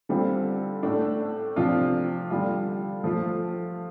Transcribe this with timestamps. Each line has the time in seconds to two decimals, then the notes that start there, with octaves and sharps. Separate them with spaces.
0.09 D3 G3 C4 F4
0.83 A2 A3 D4
1.56 C3 F3 D4 F4
2.30 D3 G3 F4
3.04 F3 A3 F4